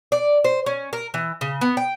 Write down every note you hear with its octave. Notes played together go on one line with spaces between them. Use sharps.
D5
C5
C#4
A#4
E3
C#3
B3
G5